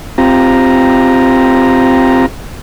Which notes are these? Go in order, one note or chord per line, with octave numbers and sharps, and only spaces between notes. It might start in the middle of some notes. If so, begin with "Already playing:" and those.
C4 F4 G4 A#5